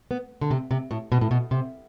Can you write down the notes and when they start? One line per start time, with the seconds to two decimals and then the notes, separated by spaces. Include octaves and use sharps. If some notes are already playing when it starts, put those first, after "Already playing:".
0.11 B3
0.41 D3
0.51 C3
0.71 C3
0.91 A2
1.12 B2
1.21 A2
1.31 B2
1.51 C3